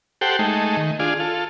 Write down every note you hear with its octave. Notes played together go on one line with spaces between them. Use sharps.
G4 A4 C5 F#5 G5
G#3 A3 D#4
D#3
D4 F4 G#4
F4 A4